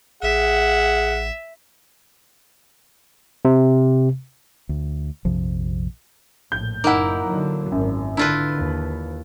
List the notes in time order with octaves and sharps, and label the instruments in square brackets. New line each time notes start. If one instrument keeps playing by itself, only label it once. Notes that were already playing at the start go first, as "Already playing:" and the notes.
[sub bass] A1 [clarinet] G#4 [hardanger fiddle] E5 [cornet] F#5
[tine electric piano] C3
[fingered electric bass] D2
A#1 F2 C3 F3
[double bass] A#1 A2 [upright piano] G6
[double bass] F#1 [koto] A#3 E4 [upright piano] D#4 F#5
[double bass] D3 F#3
[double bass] G#1 [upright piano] F#2
[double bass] D3 [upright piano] D4 [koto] E4 F4 B4
[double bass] D#2